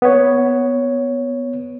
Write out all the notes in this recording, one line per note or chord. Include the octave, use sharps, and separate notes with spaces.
B3 C#5